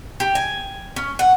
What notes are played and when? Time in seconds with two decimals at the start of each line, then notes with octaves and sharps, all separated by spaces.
0.20 G4
0.35 G#5
0.96 C#4
1.19 F#5